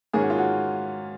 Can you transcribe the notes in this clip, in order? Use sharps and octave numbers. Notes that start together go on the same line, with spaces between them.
G#2 D#3 A#3 C#4 G#4
F#4
F4
F#4